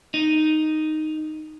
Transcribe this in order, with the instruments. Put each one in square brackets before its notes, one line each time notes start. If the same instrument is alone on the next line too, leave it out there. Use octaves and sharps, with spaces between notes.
[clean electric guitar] D#4